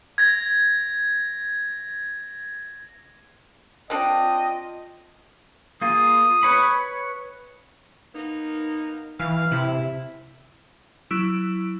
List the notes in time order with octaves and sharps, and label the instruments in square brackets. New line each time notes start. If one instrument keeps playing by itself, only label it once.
[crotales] G#6 A#6
[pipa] C4 D4 [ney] F4 [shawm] D#5 [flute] G5
[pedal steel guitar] A#3 F4 G#4 [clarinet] D#6
[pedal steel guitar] B4 C#5 B5
[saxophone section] A#3 B3 D#4
[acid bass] E3 [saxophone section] F5
[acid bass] C3 [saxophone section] E4
[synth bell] F#3 E4 E6 D7